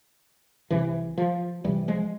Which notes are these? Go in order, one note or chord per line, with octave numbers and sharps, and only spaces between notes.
C2 C3 E3
F3
C2 C3 E3 G3
F3 G#3